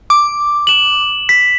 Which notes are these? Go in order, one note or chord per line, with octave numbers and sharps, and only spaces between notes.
D6
E7 F#7
B6